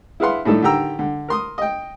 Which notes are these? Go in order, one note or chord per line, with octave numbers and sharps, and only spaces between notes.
E4 G#4 B4 F5 F#5 C6
A2 D#3 A3 D4 D#4 A4
D3 D#3 G4 G5 A#5 E6
D3
A#4 C6 D#6
D#5 G5